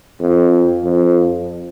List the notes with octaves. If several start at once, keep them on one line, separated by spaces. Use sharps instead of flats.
F2
F2